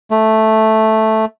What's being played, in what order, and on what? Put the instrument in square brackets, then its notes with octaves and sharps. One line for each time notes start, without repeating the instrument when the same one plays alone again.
[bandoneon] A3